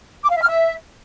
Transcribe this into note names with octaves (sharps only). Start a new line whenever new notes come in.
D6
F5
E5
F6
E5